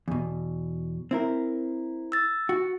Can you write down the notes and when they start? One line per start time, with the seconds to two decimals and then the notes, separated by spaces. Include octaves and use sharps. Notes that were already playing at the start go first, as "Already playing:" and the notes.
0.08 E2 B2
1.11 C4 E4 A#4
2.12 E6 A6
2.49 F#4